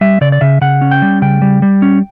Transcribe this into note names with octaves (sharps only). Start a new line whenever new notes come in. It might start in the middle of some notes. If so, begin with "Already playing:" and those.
G3 E5
C#3 D5
D5
C#3 E5
C#3 F#5
C#4
G5
G3
C#3 G5
G3
G3
C#4